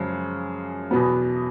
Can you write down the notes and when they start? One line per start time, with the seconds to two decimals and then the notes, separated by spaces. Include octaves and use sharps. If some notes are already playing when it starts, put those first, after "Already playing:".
Already playing: F#2 C#3 F3 G#3
0.91 E2 B2 F#3 B3